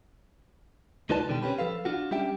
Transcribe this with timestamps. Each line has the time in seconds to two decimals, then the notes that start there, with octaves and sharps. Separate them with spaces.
1.10 D2 D#4 F4 B4 D5 A5
1.29 B2 D3 D#3 G3 G4
1.43 C4 C#4 G4 B4
1.59 F3 A4 B4 F5
1.85 D4 F4 F#4
2.11 G3 C#4 D4 G4 E5 G5